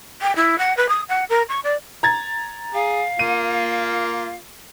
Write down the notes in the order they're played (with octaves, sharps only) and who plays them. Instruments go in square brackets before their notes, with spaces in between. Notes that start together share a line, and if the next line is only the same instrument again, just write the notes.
[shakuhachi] G5
E4
F#5
B4
D#6
F#5
A#4
C#6
D5
[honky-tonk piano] A#5 G#6 A6
[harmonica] G#4 [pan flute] F5
[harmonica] A#3 F4 [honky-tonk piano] D#7